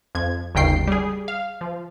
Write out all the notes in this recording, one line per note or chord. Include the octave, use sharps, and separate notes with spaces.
F2 G#6
G1 D#2 C#3 G5 C7
G3 G#4
F5
F3